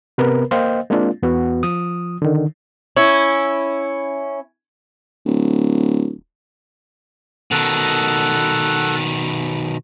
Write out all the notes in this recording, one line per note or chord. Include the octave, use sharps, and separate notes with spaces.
C3 B3 A#4 B4
A#3 C5 D#5 F5 G5
G#3 A#3 C4 D4 F4
E2 B3 F#4
F3 D#6
D3 D#3
C#4 E4
D1
B2 D#3 A4 F#5